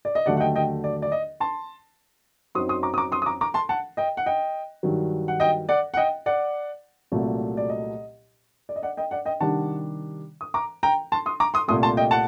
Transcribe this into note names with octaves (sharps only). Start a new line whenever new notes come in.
D5
D#5
D#2 D3 F#3 A3 D5 F#5
F#5
D#5 G5
D#5 G5
D5
D5
D#5
A5 C6
F#2 F#3 C4 D#4 C6 D#6
C6 D#6
A#5 D6
D#6
A#5 D6
C6 D#6
D#6
A#5 D6
A#5 D6
A5 C6
F#5 A5
D#5 G5
F#5
D#5 G5
G2 D#3 F#3
F#5
D#5 G5
D5 F#5
F#5
D#5 G5
D5 F#5
C2 A#2 F#3 A3
D5
D#5
D5
D#5
D5 F#5
D#5 G5
D5 F#5
D#5 G5
C3 D#3 G3 D4 F#5 A5
D#6
A#5 D6
G5 A#5
A5 C6
C6 D#6
A#5 D6
C6 D#6
C2 A#2 A3 C6 D#6
A5 C6
D#5 G5
F#5 A5